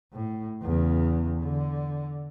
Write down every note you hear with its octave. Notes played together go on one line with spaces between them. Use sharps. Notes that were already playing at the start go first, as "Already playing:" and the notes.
A2
E2 C#3
D3